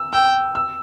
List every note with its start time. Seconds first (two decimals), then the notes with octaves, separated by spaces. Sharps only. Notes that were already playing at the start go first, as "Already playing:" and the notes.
Already playing: E6
0.13 G5 E6
0.55 E6